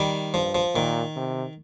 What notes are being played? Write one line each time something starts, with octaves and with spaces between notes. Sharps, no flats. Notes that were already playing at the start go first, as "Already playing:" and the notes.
Already playing: D#3 G3
G2 F3
F3
A#2 D#3
C3